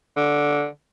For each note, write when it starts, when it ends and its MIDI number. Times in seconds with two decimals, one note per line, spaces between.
0.16 0.66 50